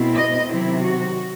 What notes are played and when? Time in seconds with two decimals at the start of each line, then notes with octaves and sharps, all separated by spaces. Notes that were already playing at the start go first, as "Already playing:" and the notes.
Already playing: B2 A3 C4 E4
0.16 D#5
0.50 C3 D#3 F#3 C4 E4
0.84 F#4